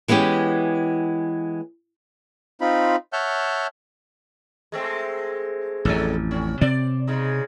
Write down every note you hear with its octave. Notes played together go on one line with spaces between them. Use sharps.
E3 G#3 B3 C#4 G4
C4 D#4 F4 B5
C#5 E5 F#5 A5 F6 G6
G#3 A3 C4
A1 F2 F#3 C#4 A4
C3 C#4
C3 C4 D5
C#3 G#3 D#4